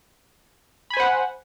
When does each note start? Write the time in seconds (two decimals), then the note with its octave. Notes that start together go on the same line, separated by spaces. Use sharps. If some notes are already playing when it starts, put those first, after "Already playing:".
0.90 B5
0.94 G#5
0.97 C5
1.00 F#5